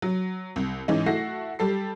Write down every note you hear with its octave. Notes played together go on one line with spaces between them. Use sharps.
F#3
C2
G#2 E3 C#4 D#4
A3 E4 F#4 A#6 C7
G3 G4 A4 C7